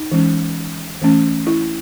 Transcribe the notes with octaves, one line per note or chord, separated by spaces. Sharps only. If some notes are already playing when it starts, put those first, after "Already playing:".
Already playing: D#4
E3 G#3 C#4
E3 A3 C#4
E4